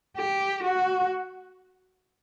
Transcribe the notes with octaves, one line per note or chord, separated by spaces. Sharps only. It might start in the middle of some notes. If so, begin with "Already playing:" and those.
G4
F#4